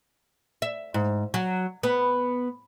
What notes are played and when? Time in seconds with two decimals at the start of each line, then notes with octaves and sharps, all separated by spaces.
0.62 E5
0.94 G#2
1.34 F#3
1.83 B3